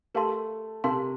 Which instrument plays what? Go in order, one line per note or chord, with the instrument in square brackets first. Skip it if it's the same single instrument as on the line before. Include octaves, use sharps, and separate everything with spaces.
[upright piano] A3 [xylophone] G4 A#4 F5 A5 C6
[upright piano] C3 [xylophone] G4 A#4 F5 A5 C6